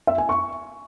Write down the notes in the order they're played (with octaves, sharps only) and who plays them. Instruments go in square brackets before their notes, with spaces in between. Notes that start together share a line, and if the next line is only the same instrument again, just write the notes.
[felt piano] E5
G#5
C#6